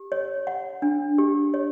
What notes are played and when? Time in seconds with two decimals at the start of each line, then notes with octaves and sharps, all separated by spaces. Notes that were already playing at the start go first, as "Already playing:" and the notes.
Already playing: G4
0.12 C#5
0.47 F#5
0.82 D4
1.18 G4
1.54 C#5